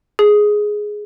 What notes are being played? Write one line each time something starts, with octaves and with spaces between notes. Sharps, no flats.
G#4